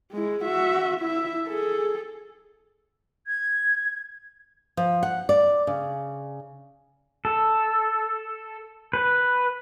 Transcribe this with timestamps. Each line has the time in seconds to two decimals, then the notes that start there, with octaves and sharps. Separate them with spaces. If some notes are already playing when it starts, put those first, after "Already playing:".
0.12 G#3 E4
0.44 F#4 E5
1.00 E4 E5
1.47 G#4 A4
3.26 G#6
4.77 F3
5.03 F#5
5.29 D5
5.67 C#3
7.25 A4
8.93 B4